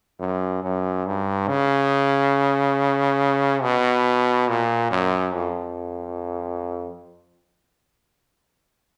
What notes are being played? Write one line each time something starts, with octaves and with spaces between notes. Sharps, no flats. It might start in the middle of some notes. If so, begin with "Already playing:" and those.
F#2
F#2
G2
C#3
B2
A#2
F#2
F2